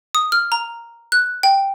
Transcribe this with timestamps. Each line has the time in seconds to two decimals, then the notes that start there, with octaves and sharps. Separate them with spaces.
0.15 D#6
0.32 F6
0.52 A#5
1.12 F#6
1.43 G5